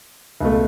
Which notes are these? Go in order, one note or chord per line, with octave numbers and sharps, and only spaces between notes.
C#2 B2 A3